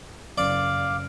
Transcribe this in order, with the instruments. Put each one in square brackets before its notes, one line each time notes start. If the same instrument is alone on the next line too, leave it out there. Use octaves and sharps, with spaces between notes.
[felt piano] F#1 [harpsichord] D5 [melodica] F5 D6